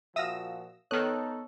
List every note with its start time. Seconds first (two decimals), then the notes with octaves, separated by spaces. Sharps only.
0.16 A#2 F3 F#4 E5 F5 D#6 E6 A#6
0.91 D#3 B3 D#4 A4 C#5 D#6 F6 F#6